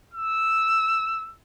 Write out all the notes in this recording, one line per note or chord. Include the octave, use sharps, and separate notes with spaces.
E6